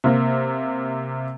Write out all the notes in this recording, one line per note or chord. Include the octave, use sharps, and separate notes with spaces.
C3 A#3